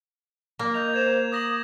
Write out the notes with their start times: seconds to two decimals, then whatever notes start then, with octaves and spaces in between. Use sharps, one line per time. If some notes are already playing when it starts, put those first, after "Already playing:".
0.59 A#3
0.74 D#5 G6 F7
0.94 C5 G#6 E7
1.32 D6 D#6 A#6 F#7